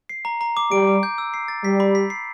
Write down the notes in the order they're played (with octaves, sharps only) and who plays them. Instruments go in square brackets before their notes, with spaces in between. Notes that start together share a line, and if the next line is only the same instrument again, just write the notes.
[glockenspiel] C7
A#5
A#5
D6
[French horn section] G3 [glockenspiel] D7
[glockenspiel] D6
G6
E6
C7
A6
[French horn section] G3 [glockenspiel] B6
[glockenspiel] B5
B6
C7